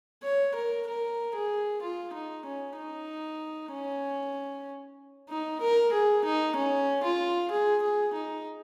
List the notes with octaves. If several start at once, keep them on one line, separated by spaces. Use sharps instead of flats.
C#5
A#4
A#4
G#4
F4
D#4
C#4
D#4
C#4
D#4
A#4
G#4
D#4
C#4
F4
G#4
G#4
D#4